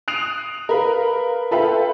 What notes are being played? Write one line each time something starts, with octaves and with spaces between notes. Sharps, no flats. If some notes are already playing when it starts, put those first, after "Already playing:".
D#6 F#6 C7 D7 D#7 F7
A#4 B4 F5
F4 A4 B4 E5 F5 G5